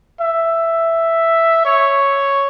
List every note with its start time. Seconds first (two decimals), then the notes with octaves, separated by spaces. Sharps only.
0.21 E5
1.65 C#5